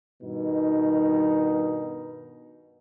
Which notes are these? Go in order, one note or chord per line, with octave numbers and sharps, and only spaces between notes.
G2 B2 D#3 D#4